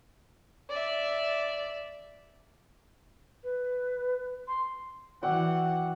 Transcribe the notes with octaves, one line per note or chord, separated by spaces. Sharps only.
D5 E5
B4
C6
E3 F#4 D5 F#5 G5